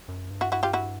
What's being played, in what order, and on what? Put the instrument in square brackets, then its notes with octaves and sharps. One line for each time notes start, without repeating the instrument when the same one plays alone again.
[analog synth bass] F#2
G2
[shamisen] E4 F#4
E4 F#4
F4 G4
E4 F#4